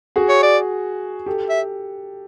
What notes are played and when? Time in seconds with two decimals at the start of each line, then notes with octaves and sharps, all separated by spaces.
0.16 F#4 G#4
0.29 C#5
0.43 D5
1.26 G4 A4
1.49 E5